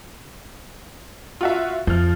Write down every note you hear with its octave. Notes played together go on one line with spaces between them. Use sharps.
F4 F#4 E5
F2 F3 F6